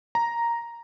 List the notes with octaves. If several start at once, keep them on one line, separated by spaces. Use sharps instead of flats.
A#5